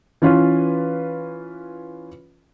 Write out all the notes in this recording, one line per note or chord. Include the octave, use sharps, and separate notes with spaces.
E3 C#4 F4 B4